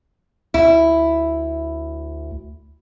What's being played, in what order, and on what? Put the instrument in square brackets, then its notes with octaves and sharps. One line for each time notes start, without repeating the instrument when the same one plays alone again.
[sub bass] D2 [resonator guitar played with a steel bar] E4